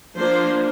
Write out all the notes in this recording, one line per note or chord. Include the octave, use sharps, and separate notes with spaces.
F3 A#3 D4 C5